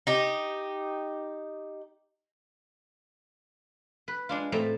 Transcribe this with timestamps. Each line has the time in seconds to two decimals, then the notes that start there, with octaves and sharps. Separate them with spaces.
0.07 D#4 G4
4.08 B4
4.29 G#3 D4 F4
4.52 A2 A3 C4 A#5